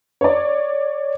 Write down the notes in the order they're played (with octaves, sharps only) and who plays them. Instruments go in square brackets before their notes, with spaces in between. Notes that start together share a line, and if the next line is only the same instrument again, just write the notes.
[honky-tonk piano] C#5 D5